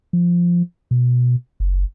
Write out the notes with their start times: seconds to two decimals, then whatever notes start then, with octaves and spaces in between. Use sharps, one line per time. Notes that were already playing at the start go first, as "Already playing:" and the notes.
0.13 F3
0.91 B2
1.60 F#1